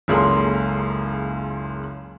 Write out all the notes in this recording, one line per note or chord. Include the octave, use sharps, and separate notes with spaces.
F#1 C#2 A#3 G#4 A4 C6